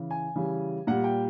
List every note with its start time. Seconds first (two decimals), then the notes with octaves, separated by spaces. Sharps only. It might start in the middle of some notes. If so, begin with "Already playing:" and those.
Already playing: C#3 E3
0.11 G#5
0.35 C#3 E3 G3
0.87 A#2 G3 F#5
1.04 G5